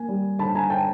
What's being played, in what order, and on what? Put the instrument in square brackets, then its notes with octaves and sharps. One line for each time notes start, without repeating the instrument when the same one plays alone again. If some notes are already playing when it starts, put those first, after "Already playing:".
Already playing: [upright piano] A#3 G#5
G3
D3 A5 B5
G#5 A#5
G5 A5